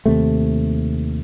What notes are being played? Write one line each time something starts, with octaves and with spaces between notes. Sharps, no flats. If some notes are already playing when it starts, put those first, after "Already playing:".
D#2 C3 A3